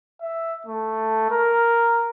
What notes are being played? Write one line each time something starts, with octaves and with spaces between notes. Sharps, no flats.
E5
A3
A#4